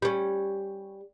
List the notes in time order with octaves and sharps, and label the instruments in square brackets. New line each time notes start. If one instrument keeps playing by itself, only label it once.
[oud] G3 C#4